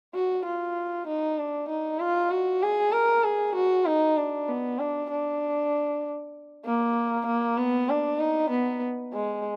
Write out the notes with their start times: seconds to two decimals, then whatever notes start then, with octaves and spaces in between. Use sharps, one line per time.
0.14 F#4
0.45 F4
1.07 D#4
1.38 D4
1.69 D#4
1.99 F4
2.31 F#4
2.62 G#4
2.92 A#4
3.24 G#4
3.55 F#4
3.86 D#4
4.17 D4
4.48 B3
4.79 D4
5.10 D4
6.65 A#3
7.26 A#3
7.57 B3
7.89 D4
8.19 D#4
8.50 B3
9.13 G#3